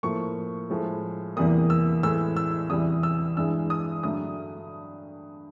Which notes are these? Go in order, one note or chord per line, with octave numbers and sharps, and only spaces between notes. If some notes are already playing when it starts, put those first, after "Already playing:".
A2 F3 A#3 C#6
A2 F3 G#3
E2 C3 E3 G3 A#3 D#6
E6
A2 E3 G#3 E6
E6
E2 C3 E3 G3 D#6
E6
G2 E3 G#3 E6
D#6
G2 D3 F#3 A3 D#6